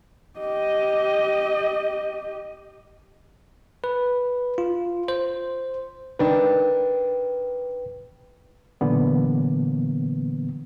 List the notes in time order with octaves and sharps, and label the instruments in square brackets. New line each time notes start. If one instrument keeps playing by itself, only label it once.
[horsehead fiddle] G4 D#5
[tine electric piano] B4
F4
C5
[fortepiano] D#3 D4 [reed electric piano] B4 G5
[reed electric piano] A#2 D3 E3 F#3 A#3 B3